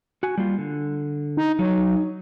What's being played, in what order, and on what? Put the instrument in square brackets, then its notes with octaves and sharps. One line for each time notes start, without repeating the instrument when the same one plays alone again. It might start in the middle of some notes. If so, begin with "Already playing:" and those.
[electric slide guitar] F#4 G#5
G3 A#3 F4
D3
[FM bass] D#4
[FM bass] F#3 [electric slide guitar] D#4